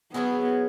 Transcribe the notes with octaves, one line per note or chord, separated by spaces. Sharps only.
F#3 B3 C#4 E4 G#4